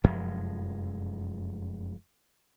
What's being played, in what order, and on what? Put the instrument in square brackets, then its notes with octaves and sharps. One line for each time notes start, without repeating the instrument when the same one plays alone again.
[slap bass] F1 F#2 F3 G#3